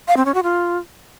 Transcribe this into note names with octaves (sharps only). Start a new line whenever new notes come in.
F5
C4
C#4
F#4
F4